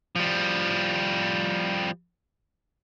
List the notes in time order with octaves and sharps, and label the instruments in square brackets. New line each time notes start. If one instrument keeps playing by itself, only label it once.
[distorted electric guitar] F3 G3